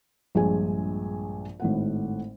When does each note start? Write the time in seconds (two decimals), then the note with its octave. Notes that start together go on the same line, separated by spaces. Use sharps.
0.35 A#1 G2 G#3 F4 G#4 G#5
1.60 G#1 A2 F#5